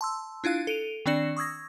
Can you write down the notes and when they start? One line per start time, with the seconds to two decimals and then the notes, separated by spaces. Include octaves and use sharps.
0.01 A5 C6 E6
0.44 D4 E4 F4 F5 F#6
0.67 A4 D7 D#7 F7
1.06 D#3 C4 D4 D5 C#7 E7
1.37 C#6 D#6 E6 G#6 A#6